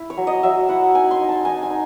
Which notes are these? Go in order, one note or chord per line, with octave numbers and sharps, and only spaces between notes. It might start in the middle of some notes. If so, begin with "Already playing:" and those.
Already playing: E4
C#5
F#3
D#5
F#3 E5
E4 F#5
D#4 G#5
C6
D#4
A5
D#4 G#5
G#5
D#4